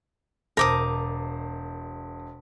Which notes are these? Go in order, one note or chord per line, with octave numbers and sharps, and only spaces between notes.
E1 A#4 C5 A5 D6 D#6